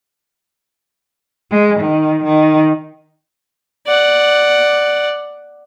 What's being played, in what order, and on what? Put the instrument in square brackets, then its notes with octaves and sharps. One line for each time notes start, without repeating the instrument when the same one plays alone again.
[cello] G#3
D#3
D#3
[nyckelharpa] D5 F#5